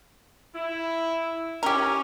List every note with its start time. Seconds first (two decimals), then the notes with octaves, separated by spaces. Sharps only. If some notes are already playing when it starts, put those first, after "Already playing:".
0.55 E4
1.63 C#4 G4 A#4